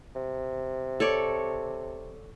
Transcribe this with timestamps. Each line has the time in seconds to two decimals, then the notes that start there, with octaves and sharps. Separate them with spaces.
0.15 C3
1.00 A4 C#5 D5